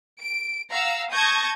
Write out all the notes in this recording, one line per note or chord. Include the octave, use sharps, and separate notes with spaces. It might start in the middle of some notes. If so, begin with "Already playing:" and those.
D7
F5 F#5 A#5 E6
A5 C#6 D#6 G6 G#6 A#6